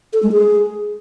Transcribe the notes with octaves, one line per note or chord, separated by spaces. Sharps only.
A4
G#3
G#4